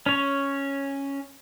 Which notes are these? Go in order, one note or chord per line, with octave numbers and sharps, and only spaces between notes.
C#4 C#5